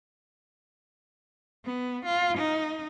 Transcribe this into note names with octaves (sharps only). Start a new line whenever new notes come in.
B3
F4
D#4